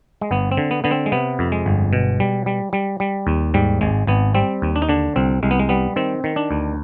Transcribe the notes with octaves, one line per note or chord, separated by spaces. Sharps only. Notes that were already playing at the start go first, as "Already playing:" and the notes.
G#3
G1 B3
C4
D3
B3
D3 B3
C4
G#3
C3 B3
F2
G#3
G1
B2
G3
G3
G3
G3
D#2
G#2 G3
G#1 G#3
G#1 B3
G3 C4
D#2
D4
D#4
D3 D4
C2 C4
C2 G#3
B3
G#3
G3 B3
D#3 C4
D#3
D4
D2